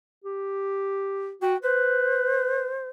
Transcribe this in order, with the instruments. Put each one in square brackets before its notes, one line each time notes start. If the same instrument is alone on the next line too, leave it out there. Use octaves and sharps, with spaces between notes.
[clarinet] G4
[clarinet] F#4 [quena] G5
[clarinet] B4 [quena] C5